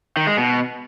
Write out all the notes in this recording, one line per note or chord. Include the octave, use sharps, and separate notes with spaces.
D#3
G#3
B2